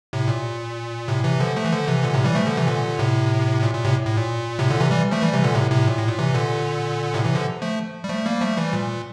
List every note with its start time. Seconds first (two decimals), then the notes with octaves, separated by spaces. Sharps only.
0.13 A2 C3
0.28 A#2
1.08 A2 C3
1.24 C3 E3
1.40 D3 F3
1.56 F3 A3
1.65 E3
1.72 D3 F3
1.87 C3 E3
2.03 A#2 D3
2.14 A2 C3
2.24 E3 G3
2.35 F3 A3
2.46 D3 F3
2.57 C3 E3
2.67 A#2 D3
2.99 A2 C3
3.63 A#2
3.74 A#2
3.84 A2 C3
4.05 A2
4.17 A#2
4.59 A2 C3
4.70 A#2 D3
4.80 C3 E3
4.91 E3 G3
5.11 F3 A3
5.22 E3 G3
5.33 C3 E3
5.43 A#2 D3
5.54 A2 C3
5.70 A2 C3
5.87 A#2
5.97 A2
6.08 A#2
6.19 C3 E3
6.34 A#2 D3
7.14 A2 C3
7.25 C3 E3
7.35 D3 F3
7.62 F3 A3
8.04 G3
8.09 F3 A3
8.26 G3 A#3
8.41 F3 A3
8.57 E3 G3
8.73 A#2